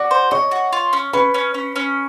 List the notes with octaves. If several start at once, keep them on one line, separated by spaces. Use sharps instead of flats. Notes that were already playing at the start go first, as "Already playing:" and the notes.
Already playing: F#4 D5 D6
C5
C#5 D#5 C#6
F#4
F4
C#4
C#4 B4 B5
C#4
C#4
C#4